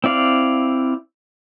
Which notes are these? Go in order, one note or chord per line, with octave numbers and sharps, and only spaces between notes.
C4 E4 D5 F5